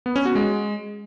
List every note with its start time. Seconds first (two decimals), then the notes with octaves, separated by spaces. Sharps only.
0.06 B3
0.16 C#4
0.25 F#4
0.35 G#3